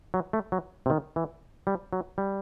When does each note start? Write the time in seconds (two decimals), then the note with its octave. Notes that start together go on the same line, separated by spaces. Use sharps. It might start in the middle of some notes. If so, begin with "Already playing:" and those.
0.14 F#3
0.33 A3
0.52 F#3
0.86 C3
0.90 D#3
1.16 E3
1.67 G3
1.93 F#3
2.18 G3